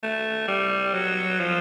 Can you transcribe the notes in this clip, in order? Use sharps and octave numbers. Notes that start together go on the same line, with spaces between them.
A3
G3
F#3
F3